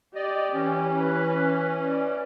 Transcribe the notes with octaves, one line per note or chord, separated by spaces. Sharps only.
G4 D5 D#5
E3 C#4
B4
D5